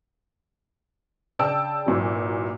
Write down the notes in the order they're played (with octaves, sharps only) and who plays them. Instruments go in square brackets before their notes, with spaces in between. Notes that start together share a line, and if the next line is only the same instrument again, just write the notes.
[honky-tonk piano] C#3 D4 G5 A5 E6 D7
G#1 A#2 E3 F#3